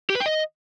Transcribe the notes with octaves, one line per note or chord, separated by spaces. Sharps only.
G4
B4
G5
D#5